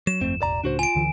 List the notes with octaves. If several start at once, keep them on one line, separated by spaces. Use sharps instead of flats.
F#3 E7
G1 F2 A3 C4
E1 A1 D5 A#5
C#2 A2 D4 F#4 C5
F4 G#5 D7
D2 D3 E3